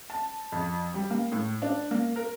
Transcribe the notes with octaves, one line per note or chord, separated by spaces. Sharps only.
A5
F2
G3
A#3
A2
D4
A#3
A#4